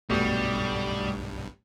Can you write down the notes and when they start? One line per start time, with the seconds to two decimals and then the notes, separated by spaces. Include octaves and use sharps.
0.10 B1 G2 B2 G3 A3 G4